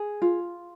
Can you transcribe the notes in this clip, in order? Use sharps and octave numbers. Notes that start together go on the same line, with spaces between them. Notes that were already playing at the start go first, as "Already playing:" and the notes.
Already playing: G#4
F4